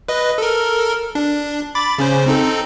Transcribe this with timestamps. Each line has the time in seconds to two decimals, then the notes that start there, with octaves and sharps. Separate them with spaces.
0.08 B4 D#5
0.38 A4 A#4
1.15 D4
1.75 B5 D6 A6
1.98 C#3 C#4 C5
2.26 C4 D#4 A4